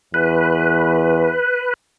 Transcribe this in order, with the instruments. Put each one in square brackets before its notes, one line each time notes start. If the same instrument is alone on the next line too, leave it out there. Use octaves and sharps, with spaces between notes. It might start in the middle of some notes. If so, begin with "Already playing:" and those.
[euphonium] E2 [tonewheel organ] B4